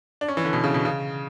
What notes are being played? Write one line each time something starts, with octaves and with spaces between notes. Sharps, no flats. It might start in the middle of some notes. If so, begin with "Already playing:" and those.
D4
C#4
E3
D3
B2
C#3
B2
C#3